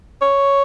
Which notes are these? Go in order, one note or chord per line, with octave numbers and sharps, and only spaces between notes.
C#5